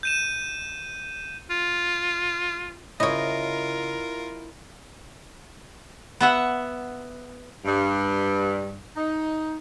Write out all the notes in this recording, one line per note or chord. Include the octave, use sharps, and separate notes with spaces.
G6 D#7 E7
F4
C#3 E4 F4 A#4 C#5 D#5
B3 E5 F#5
G2
D#4